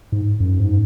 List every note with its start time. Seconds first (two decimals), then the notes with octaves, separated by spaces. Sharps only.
0.12 G#2
0.40 F#2
0.60 G#2